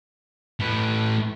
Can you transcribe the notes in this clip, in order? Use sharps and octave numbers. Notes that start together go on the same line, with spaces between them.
A2 B4